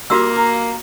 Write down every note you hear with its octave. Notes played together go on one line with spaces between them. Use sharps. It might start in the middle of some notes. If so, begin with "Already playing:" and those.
G3 A#3 F4 F#4 E6
A#4